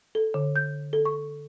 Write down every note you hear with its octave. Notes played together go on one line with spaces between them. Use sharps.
A4
D3
G6
A4
C#6